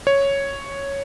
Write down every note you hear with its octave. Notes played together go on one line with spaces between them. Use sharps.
C#5